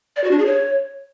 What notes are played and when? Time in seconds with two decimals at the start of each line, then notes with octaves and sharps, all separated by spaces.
0.16 D5
0.24 F#4
0.31 D4
0.39 G#4
0.46 C#5